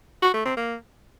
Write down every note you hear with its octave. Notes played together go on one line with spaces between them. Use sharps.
F#4
A3
C4
A#3